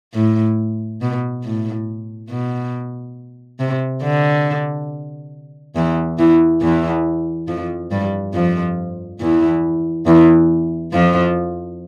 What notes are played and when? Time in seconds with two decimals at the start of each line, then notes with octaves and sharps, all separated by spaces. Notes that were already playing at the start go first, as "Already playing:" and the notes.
0.15 A2
1.01 B2
1.44 A2
2.30 B2
3.60 C3
4.03 D3
5.76 E2 E3
6.19 E2 E3
6.62 E2 E3
7.48 F2 F3
7.91 G2 G3
8.34 F2 F3
9.21 E2 E3
10.07 E2 E3
10.93 F2 F3